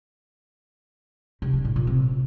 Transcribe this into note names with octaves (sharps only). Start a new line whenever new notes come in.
C3
G3
A2
A#2
C3